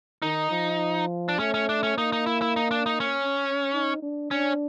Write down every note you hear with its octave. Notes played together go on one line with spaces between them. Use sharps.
D#3 D#4
F3
D4
A3 C#4
C#4
D4
C#4
A#3 D#4
D#4
E4
E4
D#4
D4
D#4
C#4
D#4
D4
C#4 D4